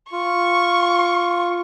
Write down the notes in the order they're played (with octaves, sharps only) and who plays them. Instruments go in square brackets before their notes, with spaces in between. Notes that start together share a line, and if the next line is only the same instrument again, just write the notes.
[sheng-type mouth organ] F4 [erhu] C#6